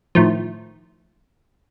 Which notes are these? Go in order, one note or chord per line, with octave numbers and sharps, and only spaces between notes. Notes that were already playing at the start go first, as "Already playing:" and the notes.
A2 D#3 F3